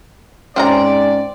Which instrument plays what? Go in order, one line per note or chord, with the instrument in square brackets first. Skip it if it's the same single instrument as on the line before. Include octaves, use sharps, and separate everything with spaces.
[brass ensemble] G#2 D5 [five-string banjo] C4 F5 A#5 [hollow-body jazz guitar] C#4